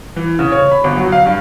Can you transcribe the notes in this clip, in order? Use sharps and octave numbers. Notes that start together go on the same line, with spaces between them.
E3
C#3
C#5
B5
G1
F#3
F5
G2